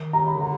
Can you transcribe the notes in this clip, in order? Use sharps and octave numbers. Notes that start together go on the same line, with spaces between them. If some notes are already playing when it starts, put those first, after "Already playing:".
Already playing: D#3
A#5
B5
C#3
D3 A#5